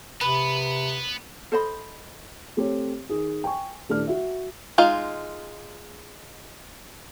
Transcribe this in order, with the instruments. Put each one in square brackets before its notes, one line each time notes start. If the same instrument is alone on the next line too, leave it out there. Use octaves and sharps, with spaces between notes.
[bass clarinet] C3 [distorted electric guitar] B3 [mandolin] B4
[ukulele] A4 C5 D#5 B5
[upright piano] A3 C4 G4 C#5
D#3 G#4
G5 G#5 C#6
D#1 A3 D4 E4 F6
F#4 E5
[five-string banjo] G#3 D#4 F4 F5